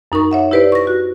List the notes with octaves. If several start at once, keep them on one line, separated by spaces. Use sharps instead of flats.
F#2 D#4 A#4 C#6
C#5 E5 F#5
E4 G4 B4 C5 D5
C#6 A#6
F#4